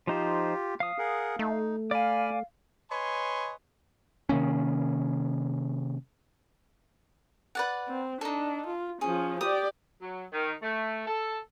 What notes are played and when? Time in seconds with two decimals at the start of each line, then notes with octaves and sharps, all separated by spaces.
0.07 F3 D#4 F4 G4 C5
0.80 F3 F5 D#6
0.98 G#4 A#4 F#5
1.39 A3 D#4
1.91 D5 F5 G#5 B5 F6
2.91 B4 C#5 D#5 G#5 C6
4.29 C3 D#3 A#3 C#4
7.55 B4 D5 F#5
7.88 C4
8.21 D4 D#4 A4
8.67 F4
9.01 F3 C#4 G#4
9.41 G4 D5 D#6
10.02 F#3
10.33 D#3
10.62 A3
11.08 A4